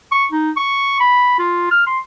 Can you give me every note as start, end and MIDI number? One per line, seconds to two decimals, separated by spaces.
0.12 0.24 85
0.32 0.50 63
0.57 0.96 85
1.00 1.35 83
1.39 1.69 65
1.71 1.83 89
1.86 1.99 84